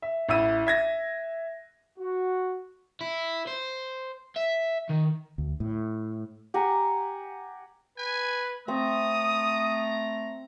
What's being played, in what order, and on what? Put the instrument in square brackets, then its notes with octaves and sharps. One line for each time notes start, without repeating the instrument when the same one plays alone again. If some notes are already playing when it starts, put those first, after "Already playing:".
[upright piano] E5
A1 E4 E5 E6 D#7
E5 G#6 A#6
[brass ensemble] F#4
[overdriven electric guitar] E4
C5
E5
D#3
[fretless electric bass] D2
A2
[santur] G4 F#5 G#5 A#5
[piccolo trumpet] B4 [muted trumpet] G#5
[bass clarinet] A3 [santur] C4 E5 [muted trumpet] A#5 [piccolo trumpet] D#6